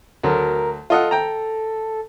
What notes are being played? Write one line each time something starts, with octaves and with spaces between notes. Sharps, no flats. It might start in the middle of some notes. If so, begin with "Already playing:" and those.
D2 F#3 A3 A#4
F4 A4 D#5 F#5
G5 A#5